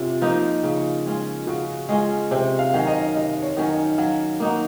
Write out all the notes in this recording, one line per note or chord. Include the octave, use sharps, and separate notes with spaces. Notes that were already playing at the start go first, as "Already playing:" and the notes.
Already playing: C3 C4 C#4 F4
F3 A#3 D#4
C#3
G#3 C#4 F4
C#3 F#4
G#3 C#4 F4
C3 C5
F5
D#3 F#3 C#4
D#5
C3 D#5
C#5
D#3 F#3 C#4
D#5
F#3 F5
A#3 D#4 F#4